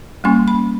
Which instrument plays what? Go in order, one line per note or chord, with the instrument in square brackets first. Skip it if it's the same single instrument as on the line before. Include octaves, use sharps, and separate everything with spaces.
[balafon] G3 A#3 C#4 C#6
B5